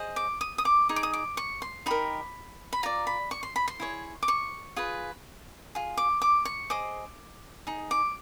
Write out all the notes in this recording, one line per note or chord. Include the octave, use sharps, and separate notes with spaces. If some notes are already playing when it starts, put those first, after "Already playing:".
Already playing: G#4 C5 D#5
D6
D#6
D#6
D6
D#4 G#4
D6
D#6
D6
C#6
C6
D#4 G4 A#4 B5
B5
F4 A#4 D5 A#5
B5
C#6
C6
B5
C6
E4 G#4 C#5
D6
C#6
F4 G#4 B4
F4 G#4
D6
D6
C#6
G#4 C5 D#5 D6
D#4 G#4
D6